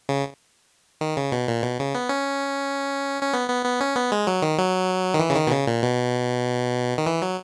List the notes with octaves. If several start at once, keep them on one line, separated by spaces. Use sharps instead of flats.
C#3
D#3
C#3
B2
A#2
B2
C#3
B3
C#4
C#4
B3
B3
B3
C#4
B3
G#3
F#3
D#3
F#3
D#3
E3
C#3
D#3
B2
C#3
A#2
B2
D#3
E3
F#3